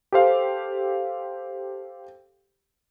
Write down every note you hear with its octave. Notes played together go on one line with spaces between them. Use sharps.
G4 A4 C5 F5